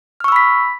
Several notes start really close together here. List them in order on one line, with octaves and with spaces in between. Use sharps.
F6 C#6 E6 B5 B6